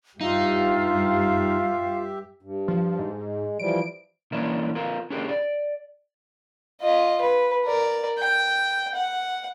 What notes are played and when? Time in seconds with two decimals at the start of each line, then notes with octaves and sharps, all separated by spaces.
0.21 G2 G3 D#4 F4 G4 E5 F5
2.42 G2
2.68 F3
2.99 G#2
3.23 G#3
3.60 E3 F3 G3 D7
4.32 E3 A#3 C#4 D4 E4 A#4
4.75 C4 F4 A#4
5.10 C#4 D4 G4 G#4 A#4
5.29 D5
6.82 F4 D#5
7.21 B4
7.65 A#4 D5
8.19 G5
8.95 F#5